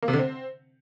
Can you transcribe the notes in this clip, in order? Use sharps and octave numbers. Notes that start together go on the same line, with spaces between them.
A#3
C3
D3
C4